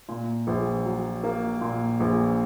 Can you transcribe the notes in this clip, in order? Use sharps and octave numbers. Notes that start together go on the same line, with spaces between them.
A#2
A#1
F#3
A#3
A#2
A#1